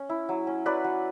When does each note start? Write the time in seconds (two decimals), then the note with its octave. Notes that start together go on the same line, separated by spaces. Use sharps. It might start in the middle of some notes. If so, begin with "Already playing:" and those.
Already playing: C#4
0.09 E4
0.29 F#3
0.47 C#4
0.66 F#3 B4 D5
0.84 F#3